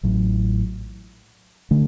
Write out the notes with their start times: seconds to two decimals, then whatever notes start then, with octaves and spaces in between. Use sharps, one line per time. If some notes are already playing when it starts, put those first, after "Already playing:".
0.03 A1 A2 F#3
1.71 D3 A3